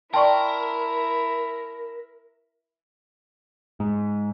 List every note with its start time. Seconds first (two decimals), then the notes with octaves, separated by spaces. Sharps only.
0.14 E4 A#4 D5 G5 A5 C6 C#6
3.80 G#2